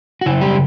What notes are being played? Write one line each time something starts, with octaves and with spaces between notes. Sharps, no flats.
F#4
F#2 C#3 E4
G3 G4